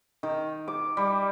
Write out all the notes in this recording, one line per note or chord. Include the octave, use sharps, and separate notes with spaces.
D#3
D6
G3